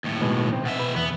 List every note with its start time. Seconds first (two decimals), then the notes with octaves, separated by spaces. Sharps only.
0.04 D#2 A2
0.21 B2 G#3 G#4
0.53 C4
0.65 B2 E5 F#5
0.79 B4
0.96 E2 B3